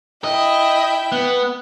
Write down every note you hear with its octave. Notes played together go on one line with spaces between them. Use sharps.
E4 D#5 G5
B3